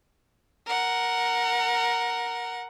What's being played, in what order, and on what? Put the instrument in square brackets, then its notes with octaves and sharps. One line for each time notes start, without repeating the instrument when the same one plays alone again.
[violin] A#4 F#5